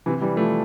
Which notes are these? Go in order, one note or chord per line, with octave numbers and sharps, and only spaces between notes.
C3 E3
E3 G3
F3 A3